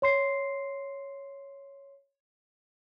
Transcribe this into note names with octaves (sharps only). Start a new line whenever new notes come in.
C#5 C6 C7